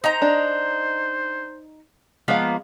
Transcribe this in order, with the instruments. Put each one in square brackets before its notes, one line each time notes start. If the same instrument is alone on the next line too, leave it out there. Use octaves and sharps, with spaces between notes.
[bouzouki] D#4 G5 A#5 [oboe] C5
[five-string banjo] D4
[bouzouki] F3 A#3 B3 [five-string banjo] G#3 F5